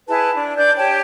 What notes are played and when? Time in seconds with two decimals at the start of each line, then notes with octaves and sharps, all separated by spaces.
0.08 E4 G#4 B4 A5
0.34 D4
0.56 D4 D5 G6
0.77 G4 C#5 G5 A5